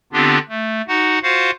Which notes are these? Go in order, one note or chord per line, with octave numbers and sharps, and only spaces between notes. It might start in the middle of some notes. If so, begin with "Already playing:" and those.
D3 B3 C4 D4 F4 G4
A3
D#4 F#4 F#5
F4 F#4 C5 F5 F#5